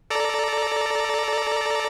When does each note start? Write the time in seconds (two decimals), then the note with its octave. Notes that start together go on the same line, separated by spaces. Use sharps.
0.10 A4 D5 A#5